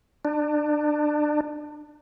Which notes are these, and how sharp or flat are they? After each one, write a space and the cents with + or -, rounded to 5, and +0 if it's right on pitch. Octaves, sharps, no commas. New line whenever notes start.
D4 +25